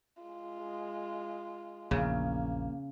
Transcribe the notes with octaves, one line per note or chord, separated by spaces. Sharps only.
G#3 F4
A#1 E2 C#3 A#3